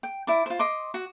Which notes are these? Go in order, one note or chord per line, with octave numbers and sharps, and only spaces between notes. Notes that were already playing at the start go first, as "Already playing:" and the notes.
G5
E4 D5
F4 C5
D#5 C6 D6
F#4